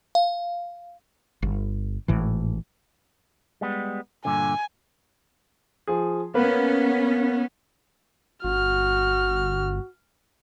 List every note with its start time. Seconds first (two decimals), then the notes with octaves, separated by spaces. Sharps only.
0.15 F5
1.42 G1
2.08 G#1 A2 E3
3.61 G3 G#3 B3
4.25 G2 A#2 D3 G#5
5.87 F3 G#4
6.34 A#3 B3 C#4 B4
8.44 G1 F#4 F6